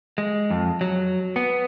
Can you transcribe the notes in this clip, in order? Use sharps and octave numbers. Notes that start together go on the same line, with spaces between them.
G#3
F2
F#3
B3